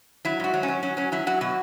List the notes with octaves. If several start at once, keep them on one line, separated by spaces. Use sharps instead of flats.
F#3 E4
G#2 F#4
F#3
C#4
F#3
F#3 C#4
F#3 C#4
F#3 E4
F#3 F#4
B2 F#4